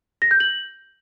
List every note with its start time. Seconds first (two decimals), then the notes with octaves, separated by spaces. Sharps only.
0.22 A#6
0.31 G6
0.40 F#7